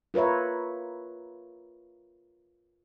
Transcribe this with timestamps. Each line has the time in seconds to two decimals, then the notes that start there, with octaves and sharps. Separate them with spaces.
0.14 F4 A#4 B4 C#5 E5